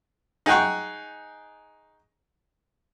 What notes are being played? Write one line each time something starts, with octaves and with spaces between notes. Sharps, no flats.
D#4 G#4 F#5 G5 C#6